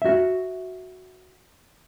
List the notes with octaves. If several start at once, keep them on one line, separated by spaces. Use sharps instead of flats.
F#4 E5